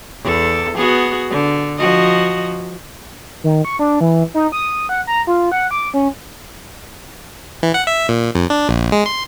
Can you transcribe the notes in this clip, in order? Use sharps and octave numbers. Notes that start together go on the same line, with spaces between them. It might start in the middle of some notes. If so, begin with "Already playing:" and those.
E2 A4
B3 F#4 G#4
D3
F3 F#4 D#5
D#3
C#6
D4
E3
D#4
D#6
F#5
A#5
F4
F#5
D6
C#4
E3
F#5
E5
A#2
F2
D4
A#1
G#3
C6